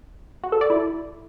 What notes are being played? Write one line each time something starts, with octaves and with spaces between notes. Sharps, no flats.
F#4
A4
D5
E4